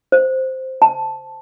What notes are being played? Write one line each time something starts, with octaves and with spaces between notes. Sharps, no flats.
C5
A5